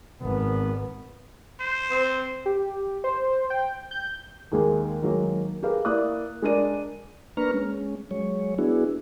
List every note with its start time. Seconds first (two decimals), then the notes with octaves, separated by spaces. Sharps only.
0.22 G#1 B3
1.60 C5
1.91 C4
2.46 G4
3.04 C5
3.50 G5
3.91 G6
4.52 D#2 G#3 A#3 G#4
5.02 D#3 F#3 G#3 A#3
5.63 G4 G#4 A#4 B4 F5
5.85 A#3 E4 D5 F5 D#6 F#6
6.42 G#3 D4 G#4 A#4 D5 D#7
7.37 A#3 D4 B4 A#5 C#6 F6
7.54 G#3 C#4
8.11 F#3 G#3 C#5
8.59 B3 D4 E4 F#4 G#4